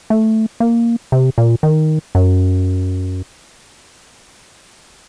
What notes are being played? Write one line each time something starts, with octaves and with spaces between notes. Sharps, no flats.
A3
A#3
C3
A#2
D#3
F#2